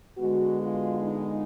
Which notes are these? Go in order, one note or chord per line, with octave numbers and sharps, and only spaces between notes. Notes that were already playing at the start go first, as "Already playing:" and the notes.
D3 G#3 B3 F#4
F4
D#4